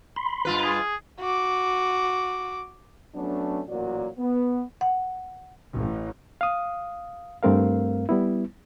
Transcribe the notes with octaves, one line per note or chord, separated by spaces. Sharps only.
B5 C6
G2 F4 B4
G#4
F#4 D6
F#3 A3 B3 C#4 D4
A1 A#2 F#3 A#3 F#4 D5
B3
F#5
A1
F5 D#6
G2 A3 C4 A#4 F5
G3 B3 E4